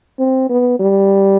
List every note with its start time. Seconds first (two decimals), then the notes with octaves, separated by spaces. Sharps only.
0.19 C4
0.49 B3
0.79 G3